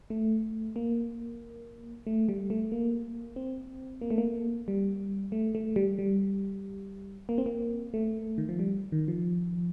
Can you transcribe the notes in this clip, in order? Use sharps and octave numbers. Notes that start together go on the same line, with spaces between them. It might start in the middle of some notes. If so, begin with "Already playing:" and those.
A3
A#3
A3
G3
A3
A#3
C4
A#3
A3
A#3
G3
A3
A3
G3
G3
A#3
C4
A#3
A3
D#3
F3
G3
D#3
F3